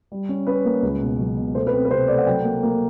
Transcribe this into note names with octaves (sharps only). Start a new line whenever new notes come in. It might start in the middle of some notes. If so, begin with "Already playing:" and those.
G3
C#4
C#4 B4
A#3
C#2
B2
F#3
B2
A3 C5
B4
C4
B4
C3 C5
A3 D5
F#5
F#3 G5
A#3
A#3